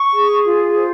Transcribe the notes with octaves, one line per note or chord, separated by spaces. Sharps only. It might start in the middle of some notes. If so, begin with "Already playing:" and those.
Already playing: C#6
G#4
F4
C5